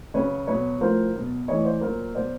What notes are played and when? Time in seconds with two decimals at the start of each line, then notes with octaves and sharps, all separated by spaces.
0.14 C#3 F#3 B4 C#5
0.47 B2 F#3 B4 C#5
0.81 A2 F3 A#4 C5
1.15 B2 F#3
1.48 A2 E3 C#5 D#5
1.65 C5 D5
1.81 A#2 F#3 A#4 C5
2.14 B2 F#3 C5 D5